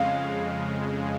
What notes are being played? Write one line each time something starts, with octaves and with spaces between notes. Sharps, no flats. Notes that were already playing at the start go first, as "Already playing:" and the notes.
Already playing: F2 C#3 G#3 F5